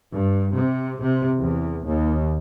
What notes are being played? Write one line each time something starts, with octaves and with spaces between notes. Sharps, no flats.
G2
C3
C3
E2
D#2